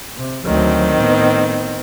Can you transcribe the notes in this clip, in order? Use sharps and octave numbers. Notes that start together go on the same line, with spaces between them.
C3
D2 D#3 F#3 C4
A2 B3